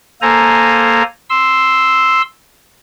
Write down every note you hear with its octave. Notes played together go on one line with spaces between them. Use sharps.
A#3 A4 C5 G#5 A#5
C6 E6